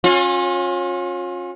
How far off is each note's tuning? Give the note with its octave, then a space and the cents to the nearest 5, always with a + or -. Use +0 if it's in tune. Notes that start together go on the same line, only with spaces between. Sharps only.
C#4 -25 F4 +35